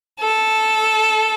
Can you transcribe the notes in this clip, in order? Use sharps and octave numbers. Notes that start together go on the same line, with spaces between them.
A4